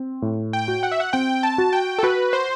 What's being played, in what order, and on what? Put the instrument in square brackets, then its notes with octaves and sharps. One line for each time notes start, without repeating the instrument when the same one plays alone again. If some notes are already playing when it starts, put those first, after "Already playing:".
Already playing: [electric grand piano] C4
A2
[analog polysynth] G5
[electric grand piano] F#4
[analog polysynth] F#5
E5
F#5
[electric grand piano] C4 [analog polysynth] G5
[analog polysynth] A5
[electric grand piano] F#4
[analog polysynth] G5
A4
[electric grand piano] F#4 [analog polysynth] B4
[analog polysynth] C5